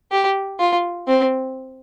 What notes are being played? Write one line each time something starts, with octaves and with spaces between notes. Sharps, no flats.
G4
F4
C4